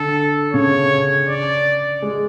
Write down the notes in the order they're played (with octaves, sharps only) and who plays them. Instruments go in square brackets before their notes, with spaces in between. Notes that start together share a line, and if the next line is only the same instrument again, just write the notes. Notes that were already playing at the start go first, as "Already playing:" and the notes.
Already playing: [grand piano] D3 [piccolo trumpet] A4
[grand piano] C#3 [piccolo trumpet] C#5
[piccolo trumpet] D5
[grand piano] G#3